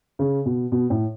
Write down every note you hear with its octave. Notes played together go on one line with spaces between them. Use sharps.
C#3
B2
B2
A2